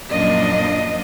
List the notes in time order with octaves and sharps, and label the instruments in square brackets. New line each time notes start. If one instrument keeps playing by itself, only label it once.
[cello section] F#2 A#2 F3 A#3 D4 D#5